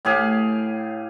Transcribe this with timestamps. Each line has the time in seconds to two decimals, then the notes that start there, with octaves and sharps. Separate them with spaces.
0.05 A2 G4 G#4 F5